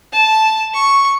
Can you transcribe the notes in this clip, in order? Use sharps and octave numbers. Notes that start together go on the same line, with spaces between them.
A5
C#6